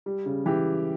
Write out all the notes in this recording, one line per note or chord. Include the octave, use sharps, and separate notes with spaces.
G3
C#3
E3 G4